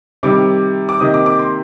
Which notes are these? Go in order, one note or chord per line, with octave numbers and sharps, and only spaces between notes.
C3 D#3 G3 D6
D6
C3 D#3 A#3 D#4 D#6
D6
D6
C6